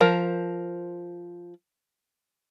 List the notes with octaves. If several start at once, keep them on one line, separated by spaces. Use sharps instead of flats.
F3 A#4 C5